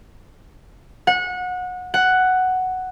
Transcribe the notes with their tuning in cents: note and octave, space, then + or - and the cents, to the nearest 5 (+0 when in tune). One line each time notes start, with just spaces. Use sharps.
F#5 -25
F#5 +5